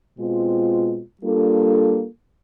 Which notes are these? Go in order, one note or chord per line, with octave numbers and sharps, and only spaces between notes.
B2 G#3 C4 F4
G3 A#3 D4 F4 A4